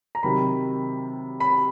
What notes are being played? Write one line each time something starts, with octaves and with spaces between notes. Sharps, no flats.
A#5
C3 D#3 F#3 B5
B5